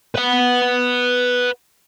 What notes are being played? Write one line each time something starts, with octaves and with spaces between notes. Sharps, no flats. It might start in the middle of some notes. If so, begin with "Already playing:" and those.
B4 F#5